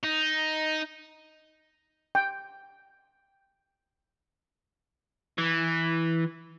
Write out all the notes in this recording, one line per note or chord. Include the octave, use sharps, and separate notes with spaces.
D#4
G5
E3